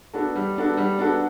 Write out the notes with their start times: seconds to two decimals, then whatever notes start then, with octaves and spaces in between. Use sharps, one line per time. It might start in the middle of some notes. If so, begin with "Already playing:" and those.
0.13 B3 D4 F#4 A4
0.35 G3
0.56 B3 D4 F#4 A4
0.77 G3
0.98 B3 D4 F#4 A4